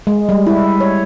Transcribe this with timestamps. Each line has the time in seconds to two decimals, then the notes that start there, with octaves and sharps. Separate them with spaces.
0.07 G#3
0.29 G3
0.47 E4
0.81 C#5